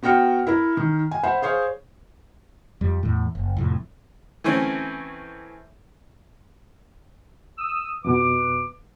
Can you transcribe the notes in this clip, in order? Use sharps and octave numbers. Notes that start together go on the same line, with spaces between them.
B3 F#4 G5 F6 C#7
E4 A#4 B5
D#3
G#5
C5 E5 F#5 B5
G#4 C5 C#5 F5
F2 G3
E2 A2
F#1
C2 F2 A2
E3 A3 C4 C#4
D#6 E6
F2 B2 B4 D6